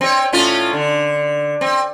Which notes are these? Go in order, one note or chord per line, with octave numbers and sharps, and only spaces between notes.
C4 C#5
A2 C#4 F4
D3
C4